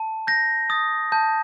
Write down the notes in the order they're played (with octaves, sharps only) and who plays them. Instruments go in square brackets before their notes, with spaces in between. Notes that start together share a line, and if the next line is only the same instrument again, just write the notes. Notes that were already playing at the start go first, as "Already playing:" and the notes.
Already playing: [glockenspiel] A5
G6 A#6
D#6 A6
A5 G6